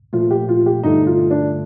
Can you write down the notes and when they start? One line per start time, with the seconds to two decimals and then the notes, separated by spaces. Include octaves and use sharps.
0.13 A#2 F3 A3 F4
0.31 G4
0.49 F4
0.66 G4
0.83 G2 D3 A3 D#4
1.06 F4
1.31 D4